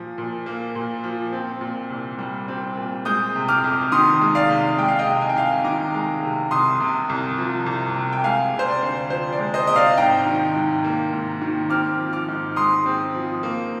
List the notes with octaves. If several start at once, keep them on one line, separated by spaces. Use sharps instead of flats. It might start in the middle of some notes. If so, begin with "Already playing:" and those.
Already playing: A#2 F3
A#2
A#3
A#2
F3
C4
A#2
C2
G3
C4
A#2
G#3 D#6 G6
C3
D6 F6
F2
D#3 C6 D#6
G#3
D5 F5
C3
G#3 G5
F5
D#5 G5
C3
G#5
G5
C2 F5 G#5
D#3 A#5 D6
G#3
C3
C2 C6 D#6
C3
C2
F3
C2
C3
G5
G#3 F5 G#5
C3
C5
D5
D2
F3 C5
D5
G#3
C5 D#5
C3 D#5
D5 F5
G#2 G5 A#5
D#3
G#2
A#3
G#2
D#3
C4 D6 F6
F3
D6 F6
G#2
G#3 C6 D#6
C4
F3
A#3